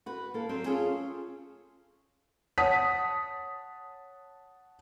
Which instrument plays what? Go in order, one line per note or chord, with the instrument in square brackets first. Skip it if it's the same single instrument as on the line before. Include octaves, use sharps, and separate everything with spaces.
[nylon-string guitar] F#4 B4
A#3 A4
F#3 C4
C#4 F4 G#4 A4 C#5 G#5
[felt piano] C#5 F#5 A5 D#6 B6